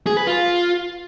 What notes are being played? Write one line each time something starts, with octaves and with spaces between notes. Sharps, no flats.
G#4
B4
F4